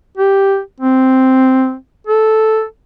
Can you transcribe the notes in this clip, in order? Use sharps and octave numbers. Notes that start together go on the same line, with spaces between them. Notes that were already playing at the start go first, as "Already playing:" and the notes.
G4
C4
A4